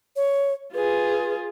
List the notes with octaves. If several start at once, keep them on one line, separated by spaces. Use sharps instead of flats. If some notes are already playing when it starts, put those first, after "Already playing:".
C#5
F4 G#4 B4